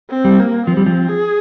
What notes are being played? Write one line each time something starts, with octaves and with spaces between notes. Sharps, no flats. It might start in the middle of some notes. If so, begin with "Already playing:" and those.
C4
G3
A#3
F3 C4
G3
F3
G#4